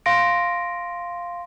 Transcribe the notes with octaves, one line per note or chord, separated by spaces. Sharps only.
F5 C6 A#6 D7